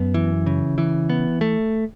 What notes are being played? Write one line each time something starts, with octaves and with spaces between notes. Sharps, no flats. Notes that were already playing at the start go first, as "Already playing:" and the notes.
Already playing: F#2 B3
E3
C#3
E3
B3
A3